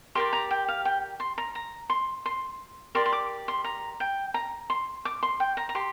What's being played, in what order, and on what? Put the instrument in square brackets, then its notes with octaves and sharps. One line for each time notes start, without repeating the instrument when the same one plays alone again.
[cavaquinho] G4 A#4 D5 C6
A#5
G5
F5
G5
C6
A#5
A#5
C6
C6
G4 A#4 D5 C6
C6
D6
C6
A#5
G5
A#5
C6
D6
C6
G5
A#5
A#5
G4 C6